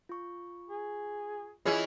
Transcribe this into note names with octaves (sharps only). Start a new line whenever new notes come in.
F4 C#6
G#4
E3 C#4 E4 F4 G#4 D#5